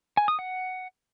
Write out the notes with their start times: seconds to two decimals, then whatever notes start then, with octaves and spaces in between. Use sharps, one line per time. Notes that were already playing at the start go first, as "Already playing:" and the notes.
0.17 G#5
0.28 D#6
0.39 F#5